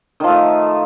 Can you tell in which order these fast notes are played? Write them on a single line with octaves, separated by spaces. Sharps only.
D#3 F3 A3